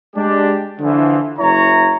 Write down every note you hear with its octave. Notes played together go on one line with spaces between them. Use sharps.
G#3 D4 G4
D3 E3 F3
F#1 E4 C#5 A#5